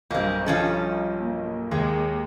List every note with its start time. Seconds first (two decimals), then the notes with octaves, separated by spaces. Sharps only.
0.11 B1 G2 A#3 C4
0.46 F3 C#4 A4
1.21 A#3
1.71 D#2 G#3